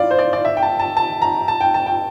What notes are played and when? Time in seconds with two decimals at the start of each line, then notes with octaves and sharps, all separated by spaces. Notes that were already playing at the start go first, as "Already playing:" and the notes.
Already playing: E4 F4 D5
0.11 C5
0.19 D5
0.33 D5
0.45 E5
0.57 G5
0.62 A5
0.80 A5
0.97 A5
1.22 A#5
1.48 A5
1.61 G5
1.74 A5
1.86 G5